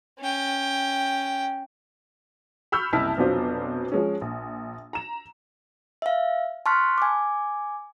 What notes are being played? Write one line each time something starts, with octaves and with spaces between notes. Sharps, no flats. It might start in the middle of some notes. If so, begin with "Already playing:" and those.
C#4 G5
B5 C#6 E6 F6 G6
F#1 C2 E4 A5 B6
F1 B2 F#3 D4 F4 C5
F3 G#3 C#4
A#1
A#5 E7
E5 F5
A5 C6 C#6 F6 F#6 B6
G#5 D6